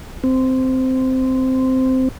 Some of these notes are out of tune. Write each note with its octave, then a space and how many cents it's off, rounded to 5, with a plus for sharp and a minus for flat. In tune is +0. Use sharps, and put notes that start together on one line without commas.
C4 -10